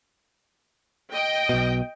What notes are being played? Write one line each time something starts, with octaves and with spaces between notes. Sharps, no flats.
D#5 G5
B1 B2